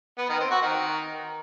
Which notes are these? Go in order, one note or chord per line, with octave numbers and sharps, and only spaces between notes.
B3
D#3
C4
F#4
D#3